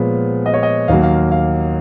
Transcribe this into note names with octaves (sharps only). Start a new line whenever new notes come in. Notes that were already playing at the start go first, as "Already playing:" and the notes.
Already playing: A#2 F3 G#3 B3 C#5
D#5
C#5
D#5
D#2 D#3 F#3 A#3 F5
F5
F5